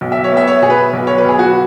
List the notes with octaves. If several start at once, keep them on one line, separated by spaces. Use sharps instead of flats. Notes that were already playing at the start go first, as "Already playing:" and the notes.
B1
E5
C#5
B3
E5
C#5
B2 G#4
B4
B1
C#5
B4
B1 G#4
F#4